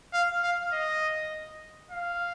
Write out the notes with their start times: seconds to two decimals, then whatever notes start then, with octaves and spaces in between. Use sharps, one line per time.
0.14 F5
0.43 F5
0.72 D#5
1.91 F5